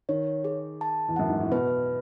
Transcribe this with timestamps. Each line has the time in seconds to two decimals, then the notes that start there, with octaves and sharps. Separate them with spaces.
0.09 D#3 C#5
0.44 G#4
0.81 A5
1.08 E2
1.16 F#2 F#5
1.29 G#2
1.40 A2
1.51 B2 B4